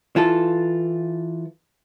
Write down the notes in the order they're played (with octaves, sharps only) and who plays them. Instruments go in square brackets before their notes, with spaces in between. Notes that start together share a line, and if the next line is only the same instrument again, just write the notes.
[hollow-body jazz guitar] E3 F4 A4